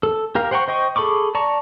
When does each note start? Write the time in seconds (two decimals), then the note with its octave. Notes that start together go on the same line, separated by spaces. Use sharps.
0.03 A4
0.35 G4 A#4 F5
0.51 C5 F#5 G5 A#5 C#6
0.68 C5 D#5 G5 C#6
0.96 G#4 A4 B5 C#6 D6
1.35 D5 A5 A#5 C#6